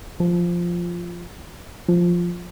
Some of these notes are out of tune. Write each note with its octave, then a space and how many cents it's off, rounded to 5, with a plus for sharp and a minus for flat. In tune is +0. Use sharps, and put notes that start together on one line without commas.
F3 -5
F3 +0